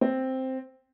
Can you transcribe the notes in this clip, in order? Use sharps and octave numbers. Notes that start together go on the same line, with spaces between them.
C4